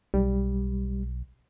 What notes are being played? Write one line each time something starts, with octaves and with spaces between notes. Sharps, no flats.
B1 G3